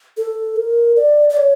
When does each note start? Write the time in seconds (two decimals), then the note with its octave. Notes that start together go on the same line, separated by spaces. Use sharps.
0.17 A4
0.56 A#4
0.96 D5
1.29 D5
1.37 C#5